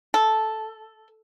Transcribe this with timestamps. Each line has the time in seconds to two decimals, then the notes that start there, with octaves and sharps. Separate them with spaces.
0.14 A4